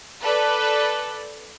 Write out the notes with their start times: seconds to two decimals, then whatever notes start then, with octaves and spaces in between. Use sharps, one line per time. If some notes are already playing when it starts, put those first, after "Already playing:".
0.22 A4 B4 D5